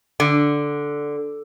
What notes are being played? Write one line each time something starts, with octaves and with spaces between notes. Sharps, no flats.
D3